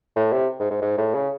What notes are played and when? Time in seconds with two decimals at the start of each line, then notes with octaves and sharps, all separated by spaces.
0.16 A2
0.33 C3
0.60 G#2
0.71 G#2
0.82 G#2
0.98 A2
1.15 C#3